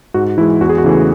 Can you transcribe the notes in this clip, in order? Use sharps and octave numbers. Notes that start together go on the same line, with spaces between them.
G#2 F#4
E3 G#3 E4
E2 F#4
G#4
F#4
C#3 E3 A3